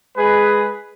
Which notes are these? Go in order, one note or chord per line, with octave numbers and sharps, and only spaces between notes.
G#3 G#4 B4